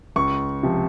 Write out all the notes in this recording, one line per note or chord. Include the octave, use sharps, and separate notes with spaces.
C#2 C#6
C3 F3